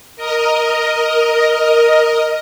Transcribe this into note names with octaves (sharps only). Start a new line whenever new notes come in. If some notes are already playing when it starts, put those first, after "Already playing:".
A#4 D#5